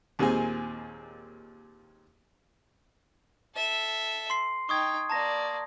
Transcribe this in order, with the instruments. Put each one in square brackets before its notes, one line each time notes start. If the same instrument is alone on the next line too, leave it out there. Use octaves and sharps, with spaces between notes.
[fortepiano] D#2 A#2 G#3 C4 G#5
[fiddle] A4 E5
[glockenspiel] C6 C7
[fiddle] D#4 G5 [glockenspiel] C#6 D#6 G#6
[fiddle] A#3 D5 [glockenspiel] A5 A#5 A#6